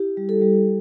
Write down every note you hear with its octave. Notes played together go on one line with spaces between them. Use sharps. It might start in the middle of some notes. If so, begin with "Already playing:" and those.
Already playing: E4 G4
G3
A4
G3